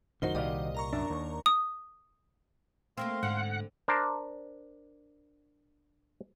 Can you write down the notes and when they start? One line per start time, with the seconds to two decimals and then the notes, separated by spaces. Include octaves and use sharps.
0.22 A#1 F#2 A2 D#3 D#4 F#4 C5 G7
0.35 C2 A#2 G4 D5 D#5 F5
0.75 A#4 A#5 C#6
0.93 F#2 D4 E5
1.10 D#2
1.46 D#6
2.97 A3 A#3 C4 F5 C6
3.23 G#2 D3 F#5
3.88 D4 A#4 C5